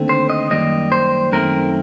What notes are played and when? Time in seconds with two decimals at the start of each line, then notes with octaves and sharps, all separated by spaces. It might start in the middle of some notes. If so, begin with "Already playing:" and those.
Already playing: D#2 D3 A3 C4
0.09 C5
0.30 D#5
0.50 F#2 D#3 G3 A#3 D#5
0.92 C5
1.32 F#2 D#3 A3 C4 A#4